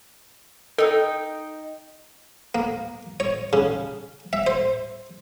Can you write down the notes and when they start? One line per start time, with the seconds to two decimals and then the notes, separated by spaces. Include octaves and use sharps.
0.78 D#4 A4 G5
2.55 A#3
3.20 C#5
3.53 C#3
4.33 E5
4.47 C5